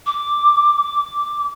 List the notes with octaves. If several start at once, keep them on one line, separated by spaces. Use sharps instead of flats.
D6